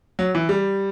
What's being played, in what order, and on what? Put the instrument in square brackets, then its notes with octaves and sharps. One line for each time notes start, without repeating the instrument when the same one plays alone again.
[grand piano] F#3
E3
G3